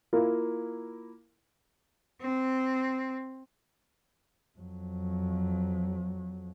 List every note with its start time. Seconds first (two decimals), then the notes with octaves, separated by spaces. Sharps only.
0.13 A#3 E4 F4 A#4
2.22 C4
4.59 F2 F#3